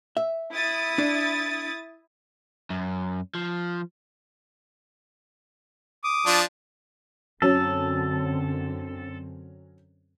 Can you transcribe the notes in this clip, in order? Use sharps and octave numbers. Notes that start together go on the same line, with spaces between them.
E5
E4 D#6 A6
D4
F#2
F3
D6 D#6
F3 D4
F#2 D3 F#3 C4 C#4 A4